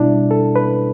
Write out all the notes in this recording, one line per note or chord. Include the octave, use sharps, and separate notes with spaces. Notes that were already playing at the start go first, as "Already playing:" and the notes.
Already playing: B2 G3 D4 E4
A4
B4